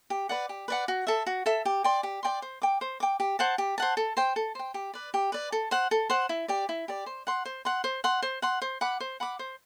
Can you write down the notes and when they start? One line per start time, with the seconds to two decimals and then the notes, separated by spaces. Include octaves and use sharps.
0.10 G4
0.29 B4 D5 F#5
0.49 G4
0.68 B4 D5 F#5
0.88 F#4
1.07 A4 E5
1.26 F#4
1.46 A4 E5
1.65 G4
1.84 D5 G5 C6
2.03 G4
2.23 D5 G5 C6
2.42 C5
2.62 G5 D6
2.81 C5
3.00 G5 D6
3.20 G4
3.39 C5 F#5 A5
3.58 G4
3.78 C5 F#5 A5
3.97 A4
4.17 C5 G5
4.36 A4
4.55 C5 G5
4.74 G4
4.94 B4 D5
5.14 G4
5.32 B4 D5
5.52 A4
5.71 C5 F#5
5.91 A4
6.10 C5 F#5
6.29 E4
6.48 G4 D5
6.69 E4
6.88 G4 D5
7.06 C5
7.27 F#5 C6
7.45 C5
7.65 F#5 C6
7.84 C5
8.04 F#5 C6
8.22 C5
8.42 F#5 C6
8.62 C5
8.81 F#5 B5 D6
9.00 C5
9.20 F#5 B5 D6
9.39 C5